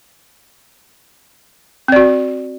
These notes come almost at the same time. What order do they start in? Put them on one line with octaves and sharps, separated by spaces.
C4 D5 F#4